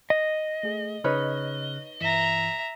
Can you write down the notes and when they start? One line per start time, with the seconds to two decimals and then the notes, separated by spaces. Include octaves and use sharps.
0.10 D#5
0.63 A3 G#4
1.04 C#3 D#4 B4 C#5 F6 F#6
2.01 G2 E3 E5 A#5